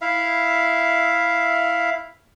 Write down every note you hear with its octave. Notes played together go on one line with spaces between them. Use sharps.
E4 E5 F5